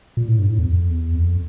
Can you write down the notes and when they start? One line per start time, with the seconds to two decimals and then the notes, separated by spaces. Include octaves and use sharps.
0.17 A#2
0.28 A2
0.39 G2
0.49 A2
0.59 E2
0.66 F2
0.90 E2
1.15 F2